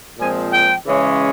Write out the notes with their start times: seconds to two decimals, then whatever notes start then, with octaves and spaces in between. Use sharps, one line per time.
0.18 A#2 F3 G#3 C4 G#5
0.52 G5
0.87 C#3 E3 G#3 C#4